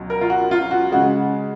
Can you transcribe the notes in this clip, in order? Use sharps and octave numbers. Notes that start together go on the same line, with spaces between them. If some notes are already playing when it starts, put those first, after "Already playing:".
Already playing: C#2 B2 F#3
A#4
F4
F#4
F4
F#4
C#3 G#3 F#4